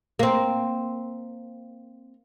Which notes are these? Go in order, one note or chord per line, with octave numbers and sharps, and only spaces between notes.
A#3 C4